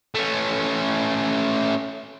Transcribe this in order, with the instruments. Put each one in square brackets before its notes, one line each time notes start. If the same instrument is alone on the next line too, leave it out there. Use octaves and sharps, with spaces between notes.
[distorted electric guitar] A3 C#4